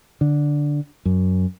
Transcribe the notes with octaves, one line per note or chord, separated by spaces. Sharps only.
D3
F#2